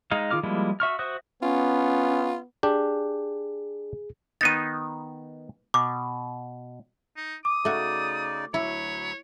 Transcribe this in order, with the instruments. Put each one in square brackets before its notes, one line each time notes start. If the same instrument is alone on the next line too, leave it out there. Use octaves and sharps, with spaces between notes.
[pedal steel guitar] G#3 D#4 F5
D#3 F4 G#4 D6 F6
F3 G3 G#3 A#3 E4
F#4 E5 C#6 F6
F#4 C5 E5 D#6 F#6
[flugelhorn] B3 [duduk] C#4 [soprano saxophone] F4
[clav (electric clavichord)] D4 G4 [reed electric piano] G#4
[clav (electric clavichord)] D#3 B3 D#4 [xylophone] A6 D#7
[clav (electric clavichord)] B2 [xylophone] D6
[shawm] D#4
[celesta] D6 [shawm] D#6
[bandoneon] C#3 D#4 D5 [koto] A3 F#4
[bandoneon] D2 F#3 B5 [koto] E4 [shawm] C#5